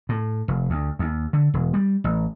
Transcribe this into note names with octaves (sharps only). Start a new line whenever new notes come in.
A2
F1
D2
D#2
D3
E1
G3
A1